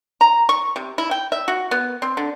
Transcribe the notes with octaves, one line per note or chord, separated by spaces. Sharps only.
A#5
C#6
C3
E4
G5
E5
F#4
B3
C4
D3